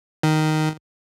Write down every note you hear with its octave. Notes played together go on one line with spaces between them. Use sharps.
D#3